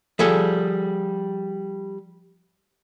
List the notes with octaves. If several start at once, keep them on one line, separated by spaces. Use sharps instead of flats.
F3 G3 G#4 A4 G#5